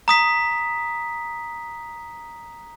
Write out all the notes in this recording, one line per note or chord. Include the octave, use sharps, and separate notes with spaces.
A#5 D#6 B6